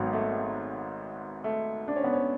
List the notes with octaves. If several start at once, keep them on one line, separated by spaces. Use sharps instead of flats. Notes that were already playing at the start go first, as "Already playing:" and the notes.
Already playing: G#1 G#2 F#3 B3
A3
A3
D4
C#4
B3
C#4